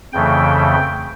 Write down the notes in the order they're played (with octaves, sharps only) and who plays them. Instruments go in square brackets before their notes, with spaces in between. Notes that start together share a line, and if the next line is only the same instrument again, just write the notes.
[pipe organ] F2 C#3 E3 A3 G5